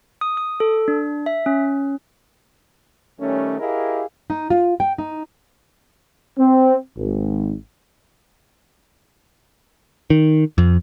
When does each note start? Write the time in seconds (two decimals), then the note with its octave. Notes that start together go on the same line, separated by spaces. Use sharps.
0.21 D#6
0.37 D#6
0.60 A4
0.88 D4
1.26 E5
1.46 C#4
3.20 D#3 G3 A3 C#4
3.59 E4 G4 G#4 A#4 D#5 F5
4.30 D#4
4.50 F4
4.80 G5
4.98 D#4
6.38 C4
6.97 G#1
10.10 D#3
10.58 F2